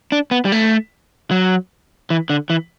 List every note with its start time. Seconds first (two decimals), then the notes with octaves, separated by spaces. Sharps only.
0.12 D4
0.31 B3
0.45 G3
0.52 A3
1.31 F#3
2.10 E3
2.30 D3
2.50 E3